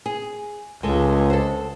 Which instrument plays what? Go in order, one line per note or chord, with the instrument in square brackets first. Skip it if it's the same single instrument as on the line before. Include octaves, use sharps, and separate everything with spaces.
[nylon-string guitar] G#4
[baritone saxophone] C#2 [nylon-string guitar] G#3 A4
[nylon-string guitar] A4 C5